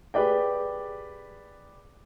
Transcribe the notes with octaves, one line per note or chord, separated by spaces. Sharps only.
G4 G#4 B4 D5 G5